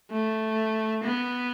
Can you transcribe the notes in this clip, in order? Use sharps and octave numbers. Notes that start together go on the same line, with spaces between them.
A3
B3